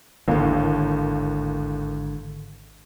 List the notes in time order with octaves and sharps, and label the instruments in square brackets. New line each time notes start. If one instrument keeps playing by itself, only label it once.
[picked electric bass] G#1 D3 [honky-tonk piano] D#2 A2 A#3